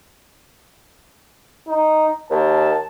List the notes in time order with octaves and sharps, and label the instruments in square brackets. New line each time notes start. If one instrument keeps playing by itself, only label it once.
[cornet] D#4
[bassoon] D#2 [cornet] A5